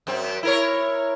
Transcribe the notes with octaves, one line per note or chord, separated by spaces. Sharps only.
F#2 C4
E4 A#4 C#5